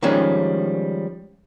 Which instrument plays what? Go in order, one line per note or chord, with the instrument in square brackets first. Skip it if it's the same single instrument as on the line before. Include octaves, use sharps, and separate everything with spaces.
[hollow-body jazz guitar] D#3 F3 G3 G#3 C#4